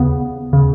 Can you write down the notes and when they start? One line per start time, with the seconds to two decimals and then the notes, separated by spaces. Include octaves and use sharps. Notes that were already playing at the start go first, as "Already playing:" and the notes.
Already playing: D#2 C#3 B3
0.53 C#3